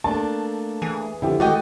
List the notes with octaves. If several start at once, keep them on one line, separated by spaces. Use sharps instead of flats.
A3 A#3 D4 A5
E3 G#4
D3 F3 E4 G4
D#3 G#3 A3 F#4 D5 D#5 G5